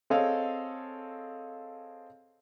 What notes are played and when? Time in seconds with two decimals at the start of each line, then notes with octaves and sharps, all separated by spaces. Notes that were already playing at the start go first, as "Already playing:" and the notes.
0.10 C4 G#4 A4 C#5 D#5 F5